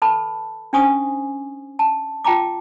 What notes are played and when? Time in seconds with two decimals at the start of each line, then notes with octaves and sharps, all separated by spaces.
0.02 A4 B4 A5 B5
0.73 C#4 D4 C5 G#5 C#6 D#6
1.79 A5
2.25 F4 G5 A5 A#5 D6